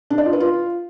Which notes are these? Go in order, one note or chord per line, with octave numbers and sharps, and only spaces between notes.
D4
D5
F4
B4
F4